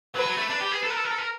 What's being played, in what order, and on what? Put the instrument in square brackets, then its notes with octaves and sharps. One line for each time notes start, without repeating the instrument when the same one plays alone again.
[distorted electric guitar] F#3 [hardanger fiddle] B4
[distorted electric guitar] F#3
A3
D4
G4
G#4
[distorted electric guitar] A4 [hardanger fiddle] B4
[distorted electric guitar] A#4
A4
A#4
A4
A#4